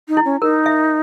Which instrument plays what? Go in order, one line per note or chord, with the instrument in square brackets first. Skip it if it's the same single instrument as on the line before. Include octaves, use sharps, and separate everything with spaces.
[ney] D#4
[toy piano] E4
[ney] C#4
[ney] D#4 [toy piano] A#4
[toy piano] E5